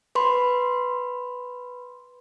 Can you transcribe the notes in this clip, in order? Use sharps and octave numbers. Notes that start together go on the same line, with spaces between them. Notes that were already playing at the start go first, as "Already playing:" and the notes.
B4 B5 C6